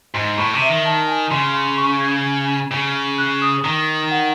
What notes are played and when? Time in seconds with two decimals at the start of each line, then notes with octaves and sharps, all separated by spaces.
0.14 G#2 C6
0.38 A2 C#6
0.54 C3
0.62 E5
0.69 D#3
0.85 A5
1.08 G#5
1.31 C#3 C6
1.54 C6
1.78 C#6
2.01 G#6
2.71 C#3
3.18 F#6
3.42 D#6
3.64 D#3
4.11 F#5